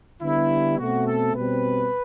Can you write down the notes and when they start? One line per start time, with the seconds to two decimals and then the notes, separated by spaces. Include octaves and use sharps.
0.22 D3 G3 B3 E4
0.79 B2 A3 C4 F#4
1.06 A4
1.35 B2 G3 C4 B4